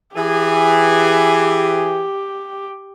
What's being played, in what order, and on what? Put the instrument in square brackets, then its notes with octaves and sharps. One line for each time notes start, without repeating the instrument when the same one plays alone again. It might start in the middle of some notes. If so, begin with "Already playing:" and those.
[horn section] E3 G#4 [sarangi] G4